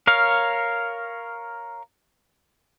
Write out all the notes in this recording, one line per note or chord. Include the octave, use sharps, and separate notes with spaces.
A#4 C#5 F5